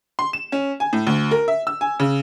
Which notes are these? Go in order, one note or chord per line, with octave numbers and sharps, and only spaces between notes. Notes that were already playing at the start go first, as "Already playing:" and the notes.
C6
E7
C#4
G#5
A2
D2
A#4
E5
E6
G#5
C#3